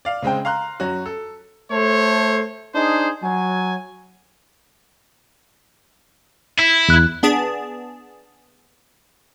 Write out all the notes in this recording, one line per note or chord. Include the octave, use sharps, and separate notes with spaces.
D5 F5
C#3 G#3 C4 G5
F5 A#5 C6 F#6
F#2 C#4 F#4
A4
A3 A4 C5 C#5
D4 D#4 G#4 C5
F#3 G#5
E4
E2 F#6
B3 D4 G#4 A5